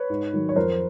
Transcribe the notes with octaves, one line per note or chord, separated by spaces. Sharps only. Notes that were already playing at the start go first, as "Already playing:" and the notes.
Already playing: B4 C#5
G#2
D#3 F#3
C#5
F2 A#4 C5